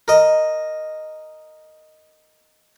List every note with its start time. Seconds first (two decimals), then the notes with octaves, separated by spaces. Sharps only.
0.08 A#4 D#5